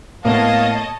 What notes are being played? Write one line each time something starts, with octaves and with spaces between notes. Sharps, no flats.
A2 A#3 B3 C#5 D#5 F5 A5